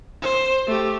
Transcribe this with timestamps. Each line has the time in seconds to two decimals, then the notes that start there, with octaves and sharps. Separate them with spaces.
0.22 C5
0.67 A3 G4